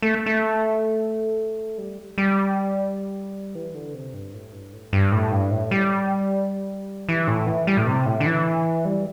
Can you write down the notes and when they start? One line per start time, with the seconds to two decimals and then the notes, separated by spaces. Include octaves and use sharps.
0.02 A3
0.26 A3
1.78 G3
2.18 G3
3.55 E3
3.74 D3
3.94 C3
4.13 G2
4.33 A2
4.53 G2
4.73 A2
4.93 G2
5.12 A2
5.32 G2
5.51 A2
5.71 G3
7.09 E3
7.28 A2
7.47 E3
7.67 G3
7.77 A2
7.87 C3
8.06 A2
8.20 D3
8.26 E3
8.85 G3